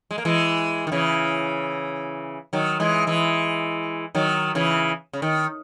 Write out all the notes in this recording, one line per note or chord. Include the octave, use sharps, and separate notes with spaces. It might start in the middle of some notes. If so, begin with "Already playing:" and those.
G#3
A#3
E3 G#3
D#3
C#3 E3
D#3 F#3
E3 G#3
E3 G#3
D#3 F#3
C#3 E3
C#3
D#3